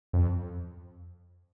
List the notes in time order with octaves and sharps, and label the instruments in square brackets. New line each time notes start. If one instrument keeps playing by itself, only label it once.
[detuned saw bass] F2